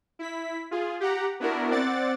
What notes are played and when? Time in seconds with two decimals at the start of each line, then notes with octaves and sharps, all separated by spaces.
0.19 E4 B6
0.71 F4 G#4
1.00 G4 F#5 A#5
1.40 B3 D4 E4 F#4 A#4
1.70 C4 D5 F#5 A6